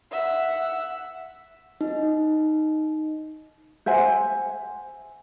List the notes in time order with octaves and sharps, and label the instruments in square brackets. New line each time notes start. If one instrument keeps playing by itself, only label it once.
[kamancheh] E5 F#5
[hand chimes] D#4
[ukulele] C5 E5 F#5 G#5